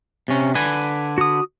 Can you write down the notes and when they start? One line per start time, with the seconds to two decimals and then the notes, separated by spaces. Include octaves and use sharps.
0.28 C3 C#4
0.55 D3 B4 G#5
1.18 F#4 D#6